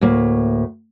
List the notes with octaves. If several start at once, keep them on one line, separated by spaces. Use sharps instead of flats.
D2 A2 A#3